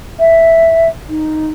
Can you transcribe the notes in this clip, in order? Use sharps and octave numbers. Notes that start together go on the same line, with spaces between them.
E5
D#4